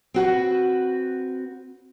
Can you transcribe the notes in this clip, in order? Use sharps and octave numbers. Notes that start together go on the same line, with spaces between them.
C4 F#4 B4